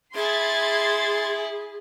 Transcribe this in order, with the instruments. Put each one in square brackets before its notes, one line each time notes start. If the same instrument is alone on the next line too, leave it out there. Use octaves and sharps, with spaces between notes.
[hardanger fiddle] E4 [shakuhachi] G#4 [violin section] C6 G#6 A6